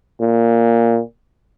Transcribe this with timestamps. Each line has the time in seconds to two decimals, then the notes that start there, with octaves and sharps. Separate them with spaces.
0.21 A#2